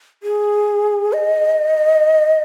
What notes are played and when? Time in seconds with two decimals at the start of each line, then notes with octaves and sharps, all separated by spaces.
0.23 G#4
1.13 D#5